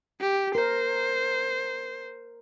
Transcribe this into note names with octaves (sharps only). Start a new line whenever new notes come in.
G4
A#4 C5